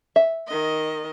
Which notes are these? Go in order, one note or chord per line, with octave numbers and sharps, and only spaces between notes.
E5
D#3 D#5